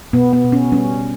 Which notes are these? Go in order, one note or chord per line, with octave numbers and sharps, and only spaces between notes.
B2 B3
B3
B2
C#4
G3 C#4